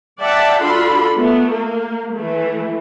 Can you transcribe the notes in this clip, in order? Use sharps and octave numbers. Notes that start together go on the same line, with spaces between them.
D5 E5 F#5 G5 A5
D4 F4 F#4 A4 B5 C6
A3 B3
A#3
E3 A3